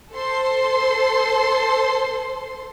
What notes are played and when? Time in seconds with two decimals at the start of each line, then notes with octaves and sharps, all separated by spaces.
0.13 A4 C5 C6